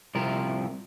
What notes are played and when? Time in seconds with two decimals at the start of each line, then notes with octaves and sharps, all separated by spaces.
0.15 C2 C3 F3 A#4